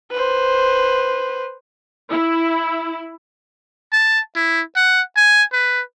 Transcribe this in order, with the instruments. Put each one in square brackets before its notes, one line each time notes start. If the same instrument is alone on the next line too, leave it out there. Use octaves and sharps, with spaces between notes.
[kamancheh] B4 C5
[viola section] E4
[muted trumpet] A5
E4
F#5
G#5
B4